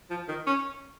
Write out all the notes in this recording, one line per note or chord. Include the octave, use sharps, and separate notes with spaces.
F3
D#3
C#4